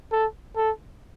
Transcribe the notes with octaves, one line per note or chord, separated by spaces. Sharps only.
A4
A4